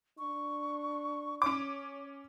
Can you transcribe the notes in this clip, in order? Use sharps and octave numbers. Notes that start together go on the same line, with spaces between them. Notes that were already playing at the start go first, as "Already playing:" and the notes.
D4 C#6
C#4 C#5 D6